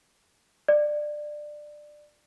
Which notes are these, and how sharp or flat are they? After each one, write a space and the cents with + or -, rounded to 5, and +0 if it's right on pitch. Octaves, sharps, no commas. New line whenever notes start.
D5 +20